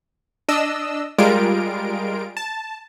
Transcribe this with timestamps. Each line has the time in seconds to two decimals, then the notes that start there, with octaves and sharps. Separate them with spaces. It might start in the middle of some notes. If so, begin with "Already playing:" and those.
0.49 D4 D#5 E6
1.18 G3 G#3 F4 A#4 D7
2.37 A5